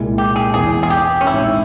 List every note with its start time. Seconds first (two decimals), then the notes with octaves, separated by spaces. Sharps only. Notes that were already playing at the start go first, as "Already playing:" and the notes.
Already playing: C2 A#2 G#3 E4
0.18 G4
0.36 G#4
0.54 E1 E2 E3 G#4
0.83 G#4
0.90 G4
1.21 C#4
1.27 A#1 G#2 F3 C4 E4